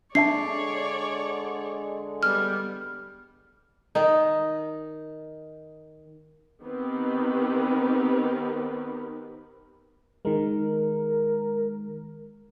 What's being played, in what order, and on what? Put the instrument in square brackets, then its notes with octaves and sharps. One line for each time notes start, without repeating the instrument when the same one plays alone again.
[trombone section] D3 G#3 [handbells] D4 E5 A5 [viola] C#5 D5 [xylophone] C7
[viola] G3 B3 [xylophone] F6
[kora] D#3 D#4
[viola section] D#3 B3 C4 G4 A#4 B4
[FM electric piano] D#3 G#3 [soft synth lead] A#4